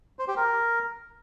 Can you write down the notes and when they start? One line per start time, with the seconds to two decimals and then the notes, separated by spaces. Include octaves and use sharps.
0.19 C5
0.28 G4
0.37 A#4